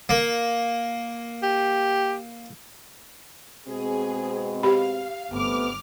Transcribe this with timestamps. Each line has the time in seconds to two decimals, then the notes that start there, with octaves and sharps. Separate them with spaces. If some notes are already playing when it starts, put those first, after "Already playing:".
0.09 A#3
1.43 G4
3.68 B2 G#3 C4 G#4
4.63 G4 F5 B5
5.33 G1 C3 A3 B3 D6 F6